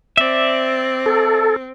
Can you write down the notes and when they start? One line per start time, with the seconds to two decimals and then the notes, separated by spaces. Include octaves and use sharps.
0.17 C4 D5 E5
1.06 A4